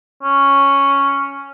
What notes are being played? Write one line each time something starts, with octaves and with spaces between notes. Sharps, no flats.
C#4